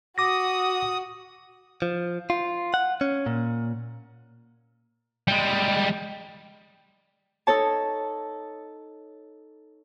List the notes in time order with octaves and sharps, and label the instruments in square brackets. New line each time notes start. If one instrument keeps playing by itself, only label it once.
[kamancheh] F#4 [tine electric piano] D6 A#6 [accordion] D#6
[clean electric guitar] F3
F4
F#5
C#4
A#2
[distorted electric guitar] G3 G#3
[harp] D#4 A4 C#5 A5